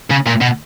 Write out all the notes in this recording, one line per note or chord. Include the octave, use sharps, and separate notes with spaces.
C#3
A#2
B2